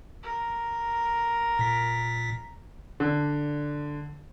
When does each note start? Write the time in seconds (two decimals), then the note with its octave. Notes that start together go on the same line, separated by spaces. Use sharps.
0.23 A#4
1.59 A#2 B6
3.00 D3